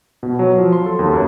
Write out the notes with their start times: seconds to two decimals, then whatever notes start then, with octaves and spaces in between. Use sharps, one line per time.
0.23 B2
0.39 F#3
0.58 F3
0.72 C6
0.86 A4
0.99 D#2
1.14 F#2